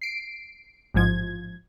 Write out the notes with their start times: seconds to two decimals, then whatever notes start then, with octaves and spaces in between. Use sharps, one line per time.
0.02 C7 D7
0.94 A1 G#2 F3 G#6